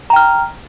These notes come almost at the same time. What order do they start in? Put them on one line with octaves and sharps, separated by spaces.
A#5 G5 F6